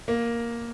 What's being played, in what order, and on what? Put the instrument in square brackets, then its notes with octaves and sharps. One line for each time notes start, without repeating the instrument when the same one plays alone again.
[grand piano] A#3